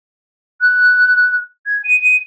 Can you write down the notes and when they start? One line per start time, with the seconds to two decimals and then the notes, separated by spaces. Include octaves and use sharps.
0.61 F#6
1.66 G#6
1.84 D#7
2.02 D#7